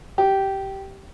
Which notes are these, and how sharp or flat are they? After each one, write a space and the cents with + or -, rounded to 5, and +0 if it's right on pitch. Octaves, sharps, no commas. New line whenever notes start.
G4 -15